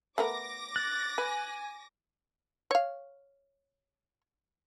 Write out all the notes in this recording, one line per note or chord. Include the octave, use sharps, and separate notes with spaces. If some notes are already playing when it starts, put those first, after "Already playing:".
A3 B3 A#4 D6 A#6
F#6 A6
B4 G#5
C#5 F5